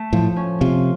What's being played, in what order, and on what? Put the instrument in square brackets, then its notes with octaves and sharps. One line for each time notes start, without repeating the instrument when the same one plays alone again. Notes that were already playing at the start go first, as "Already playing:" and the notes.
Already playing: [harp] A3
[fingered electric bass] A2 [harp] F3
[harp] C#4
[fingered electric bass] C3 [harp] F4